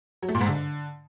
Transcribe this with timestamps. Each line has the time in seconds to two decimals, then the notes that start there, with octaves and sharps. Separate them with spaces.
0.23 F#3
0.29 A3
0.35 A#2
0.41 G#2
0.47 D3